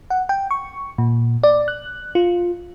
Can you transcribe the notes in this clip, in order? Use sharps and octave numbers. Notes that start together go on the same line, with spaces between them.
F#5
G5
C#6
A#2
D5
F#6
F4